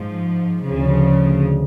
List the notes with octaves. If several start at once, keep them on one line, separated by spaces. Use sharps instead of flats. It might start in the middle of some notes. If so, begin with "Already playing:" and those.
Already playing: G#2 F3
D2 C#3 F3